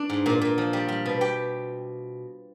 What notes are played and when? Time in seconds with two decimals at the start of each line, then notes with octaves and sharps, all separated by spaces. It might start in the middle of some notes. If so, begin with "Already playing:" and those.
Already playing: D4
0.10 G#2
0.26 A#2
0.41 A#2
0.58 F3
0.73 G3
0.88 G3
1.06 B2
1.21 G4 G5